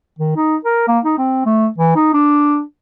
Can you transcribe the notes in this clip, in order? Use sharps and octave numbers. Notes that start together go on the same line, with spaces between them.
D#3
D#4
A#4
A#3
D#4
C4
A3
E3
D#4
D4